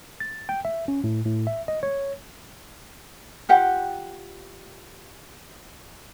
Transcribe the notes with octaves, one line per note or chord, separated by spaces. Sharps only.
A6
G5
E5
C#4
A2
A2
E5
D#5
C#5
F4 G4 F#5 G5